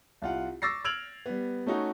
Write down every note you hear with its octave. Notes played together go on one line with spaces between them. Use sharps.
C2 F4 F#5
C#6 D6 E6 A6 A#6 C7
E6 F6 G#6 D7 F7 F#7
G3 B3
A3 C#4 D#4 F#4